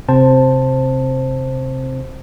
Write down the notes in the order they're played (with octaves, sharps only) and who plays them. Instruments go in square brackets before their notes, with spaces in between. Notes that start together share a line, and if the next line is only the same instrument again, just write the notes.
[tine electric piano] C3 C4 C5 A5